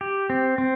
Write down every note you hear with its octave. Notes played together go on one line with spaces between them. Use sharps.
G4
C4
C4